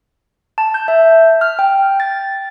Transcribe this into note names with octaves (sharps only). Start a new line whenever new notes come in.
A5
G6
E5
F6
G5
A6